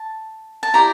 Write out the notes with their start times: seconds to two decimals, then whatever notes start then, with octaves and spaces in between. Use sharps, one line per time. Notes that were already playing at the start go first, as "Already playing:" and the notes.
Already playing: A5
0.63 A5
0.74 E4 G4 D5 A#5